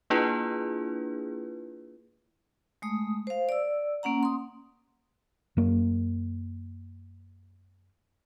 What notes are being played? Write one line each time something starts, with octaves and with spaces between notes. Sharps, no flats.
A#3 D4 E4 F4 G#4 B4
G#3 A3 D#6
C5 F5
D5 E6
A#3 C#4 F#5 A#5
C6 D#6
F#2 A#3